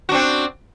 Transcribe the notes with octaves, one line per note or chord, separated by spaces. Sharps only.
C4 D4 F#4